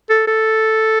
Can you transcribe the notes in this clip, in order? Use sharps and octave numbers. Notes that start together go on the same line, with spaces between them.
A4
A4